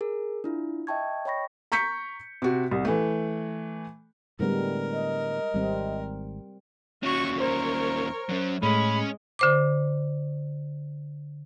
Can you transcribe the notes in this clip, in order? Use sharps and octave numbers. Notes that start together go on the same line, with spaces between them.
G#4 A#4
D4 E4 F4
D#5 E5 G5 A5 C#6 G#6
C#5 D#5 G5 B5 C#6 A#6
A#5 C#6 G6 B6 C#7
C3 F#4
C2
E3 A3
A2 D3 G3 G#3 B3 A#4
D#5
G#1 G3 C4
D#2 C#4 F#4 C#6
A#4 C5 C#5
F#3 C#4
A2 G#3 A3 C#4 C#5 B5
D3 C5 D6